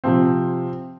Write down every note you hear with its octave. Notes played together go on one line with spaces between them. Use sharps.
C3 F3 C4